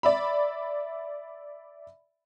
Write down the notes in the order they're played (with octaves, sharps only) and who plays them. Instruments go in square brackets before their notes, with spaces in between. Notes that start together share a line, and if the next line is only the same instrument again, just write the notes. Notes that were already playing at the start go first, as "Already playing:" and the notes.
[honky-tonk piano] D5 E5 B5